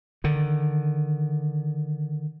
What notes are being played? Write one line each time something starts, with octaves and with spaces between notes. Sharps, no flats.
D3 D#3